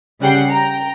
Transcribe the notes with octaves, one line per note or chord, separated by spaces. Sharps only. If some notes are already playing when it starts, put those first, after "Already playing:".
C#3 G3 F#5 G5 C7
G5 A#5